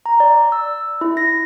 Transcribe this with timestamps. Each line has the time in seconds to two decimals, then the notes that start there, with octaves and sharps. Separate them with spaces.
0.06 A#5
0.20 D5
0.52 E6
1.01 E4
1.17 A#6